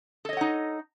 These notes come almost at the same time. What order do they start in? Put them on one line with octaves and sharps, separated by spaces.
A4 D#5 C#5 F#5 D#4